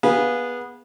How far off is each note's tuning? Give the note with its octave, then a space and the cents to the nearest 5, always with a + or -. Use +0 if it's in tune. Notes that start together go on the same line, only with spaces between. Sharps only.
B3 -15 G#4 -20 F5 +0